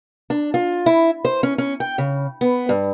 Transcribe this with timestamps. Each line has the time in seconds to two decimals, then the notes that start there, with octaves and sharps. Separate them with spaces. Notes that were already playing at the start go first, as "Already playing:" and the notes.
0.30 D4
0.54 F4
0.86 E4
1.25 C5
1.43 C#4
1.58 C#4
1.80 G5
1.98 C#3
2.41 B3
2.69 G2